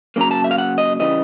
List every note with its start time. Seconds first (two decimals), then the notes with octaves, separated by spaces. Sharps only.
0.16 C#3 F#3 A#3 A#5
0.31 A5
0.44 E5
0.51 F5
0.58 F#5
0.78 D#5
1.00 C#3 E3 G3 D#5